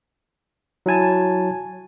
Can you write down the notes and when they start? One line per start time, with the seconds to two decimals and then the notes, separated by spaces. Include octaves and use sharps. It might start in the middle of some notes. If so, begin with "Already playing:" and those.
0.86 F#3 E4 G#5 A5